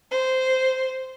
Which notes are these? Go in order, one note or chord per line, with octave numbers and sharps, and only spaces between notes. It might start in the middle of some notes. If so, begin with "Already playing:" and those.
C5